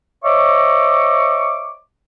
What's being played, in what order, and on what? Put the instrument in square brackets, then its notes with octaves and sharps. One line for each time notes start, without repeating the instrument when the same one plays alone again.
[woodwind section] C5 C#5 D#5 E5 C#6 D6